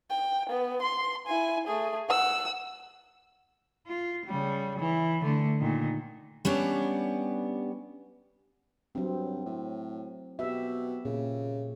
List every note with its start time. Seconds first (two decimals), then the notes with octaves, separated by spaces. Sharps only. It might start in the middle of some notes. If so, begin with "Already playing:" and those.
0.10 G5
0.49 B3
0.82 C6
1.27 E4 G#5
1.67 A3 G#4
2.08 F#5 E6
3.87 F4
4.26 C#3 G3
4.79 E3
5.22 D3 A3
5.59 A#2 D#3
6.45 G3 B3 C#4 D4
8.95 G2 F#3 C4
9.46 A2
10.39 B2 G4 E5
11.05 A#2 C#3